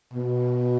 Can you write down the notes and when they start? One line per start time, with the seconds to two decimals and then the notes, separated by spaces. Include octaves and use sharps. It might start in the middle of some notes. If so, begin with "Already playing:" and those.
0.13 B2